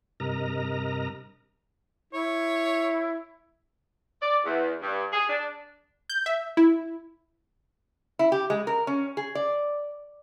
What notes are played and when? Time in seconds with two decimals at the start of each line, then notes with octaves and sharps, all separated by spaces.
0.20 G2 C3 A#4 D#5 A#5
2.13 E4 C#5
4.22 D5
4.45 E2
4.82 G2
5.13 G#4
5.29 D4
6.09 G6
6.26 E5
6.57 E4
8.19 E4
8.32 G4
8.50 G#3
8.67 A#4
8.87 C#4
9.17 G#4
9.35 D5